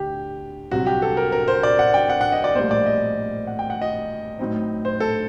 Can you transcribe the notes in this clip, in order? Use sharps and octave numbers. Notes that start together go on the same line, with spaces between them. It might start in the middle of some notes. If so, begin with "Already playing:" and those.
Already playing: D2 D3 G4
C2 C3 F#3 F#4
G4
A4
A#4
A#4
C5
D5
F#5
G5
F#5
F#5
D#5
D5
A#1 A2 G3 A#3 C5
D5
D#5
F#5
G5
F#5
D#5
A2 F#3 C4 D#4
C5
A4